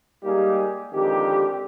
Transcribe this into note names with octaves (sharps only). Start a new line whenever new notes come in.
G3 G#3 A#3 D#4 G4 G#4
F2 D3 D#3 G#3 G4